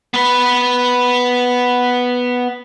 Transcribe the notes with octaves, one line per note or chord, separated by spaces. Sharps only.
B3 B4